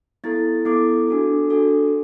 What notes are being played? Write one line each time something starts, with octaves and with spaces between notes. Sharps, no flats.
B3 E4 A4 A6
B3 E4 A4 D6
D4 F#4 A4
D4 F#4 A4